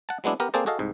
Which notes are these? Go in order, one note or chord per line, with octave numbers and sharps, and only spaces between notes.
F#5 A5
F#3 G#3 B3 D4 E4
B3 G4 A#4
A#3 C4 G#4 A4 C5 D5
F#4 G#4 A4 D#5 F5
C2 G#2